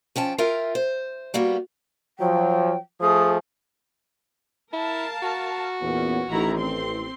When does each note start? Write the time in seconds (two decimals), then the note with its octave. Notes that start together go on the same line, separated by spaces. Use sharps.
0.16 F3 C#4 G5 A5
0.38 F4 A#4 E5 G5
0.75 C5
1.34 G3 A#3 B3 F#4
2.18 F3 F#3 G5
3.01 F3 A3 G#4 D#6
4.73 E4 A#4 F5 A5
5.23 F#4
5.81 E2 A#2 B3 C#4
6.29 A1 D#3 E4 A#5
6.58 C4 C6